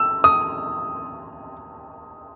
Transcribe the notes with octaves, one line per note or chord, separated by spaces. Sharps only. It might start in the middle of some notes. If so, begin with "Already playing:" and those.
Already playing: E6
D#6